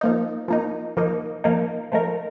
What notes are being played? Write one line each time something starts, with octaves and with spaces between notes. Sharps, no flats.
F3 A#3 D#4
F3 A#3 D#4
F3 A#3 D#4
F3 A#3 D#4
F3 A3 D#4 A#4